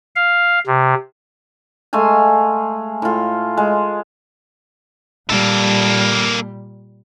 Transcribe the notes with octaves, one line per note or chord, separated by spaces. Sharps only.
F5
C3
G#3 A3 F5 G#5
A2 F4
G#3
A#2 G3 A#3 A4